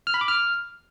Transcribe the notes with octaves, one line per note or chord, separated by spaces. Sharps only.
F6
B5
D6
F6